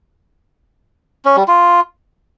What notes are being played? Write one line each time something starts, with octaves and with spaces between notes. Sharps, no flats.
C#4
G3
F4